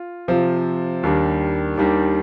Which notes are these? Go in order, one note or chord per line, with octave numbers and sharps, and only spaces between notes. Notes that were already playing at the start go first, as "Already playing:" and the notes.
Already playing: F4
C3 F3 C4 F4
D#2 D#3 G3 D4
D#2 D#3 G3 D4